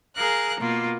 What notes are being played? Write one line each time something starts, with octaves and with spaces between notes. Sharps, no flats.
G#4 A#4 F5 A#5 F#6
B2 A#3 F4